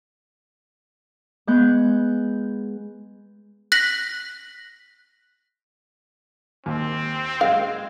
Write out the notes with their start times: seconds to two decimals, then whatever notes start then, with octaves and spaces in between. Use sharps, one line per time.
1.47 G#3 B3 F#6 G6
3.72 F#6 A#6 B6 F#7
6.66 D#2 C4
7.41 G#3 F5